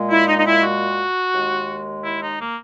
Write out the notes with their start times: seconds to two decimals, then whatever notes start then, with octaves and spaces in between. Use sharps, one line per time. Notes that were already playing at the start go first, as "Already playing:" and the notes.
Already playing: A#2 G#3
0.11 E4
0.28 D#4
0.38 D#4
0.46 E4
0.63 F#4
1.33 D#2 D#3 G#3
2.04 E4
2.22 D#4
2.39 A#3